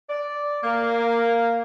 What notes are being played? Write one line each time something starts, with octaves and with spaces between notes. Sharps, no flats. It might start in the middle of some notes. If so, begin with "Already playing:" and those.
D5
A#3